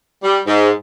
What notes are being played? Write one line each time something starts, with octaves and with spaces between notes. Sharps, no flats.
G3
G#2